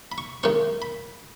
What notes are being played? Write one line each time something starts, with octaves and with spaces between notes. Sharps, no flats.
B5
C#6
D#3 G#3 C#4 C#6
B5